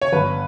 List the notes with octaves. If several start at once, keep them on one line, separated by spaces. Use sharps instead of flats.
C#5
G1 B4